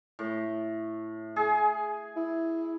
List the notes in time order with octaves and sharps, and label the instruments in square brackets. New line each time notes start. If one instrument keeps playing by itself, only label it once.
[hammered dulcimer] A2
G#4
[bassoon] E4